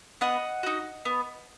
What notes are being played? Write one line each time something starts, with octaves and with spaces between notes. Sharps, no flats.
B3 D#5 F#5
D#4 F#4
B3